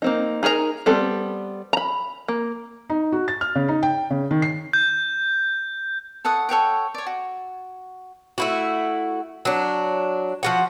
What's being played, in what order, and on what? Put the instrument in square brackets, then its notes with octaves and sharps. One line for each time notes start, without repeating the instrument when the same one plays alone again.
[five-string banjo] A#3 C4 D#4
D#4 G#4 A#4 D5 A#5
G3 B3 C4 A4
A#5 B5
A#3
[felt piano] D#4
F#4
A6
F6
C#3
D#4
G5
C#3
D#3
C7
[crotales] G6
[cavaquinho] A4 C#5 F#5 D#6
A4 C#5 F#5 G5
C#5 D5
F#4
[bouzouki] A3 E4 F#4
F#3 D4
F3 F#4 F#5